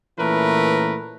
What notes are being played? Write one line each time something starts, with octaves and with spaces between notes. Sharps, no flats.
A#2 E3 A3 C#4 A#4 B4